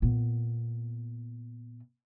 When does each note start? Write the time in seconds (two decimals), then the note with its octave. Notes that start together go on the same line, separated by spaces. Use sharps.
0.02 A#2 B3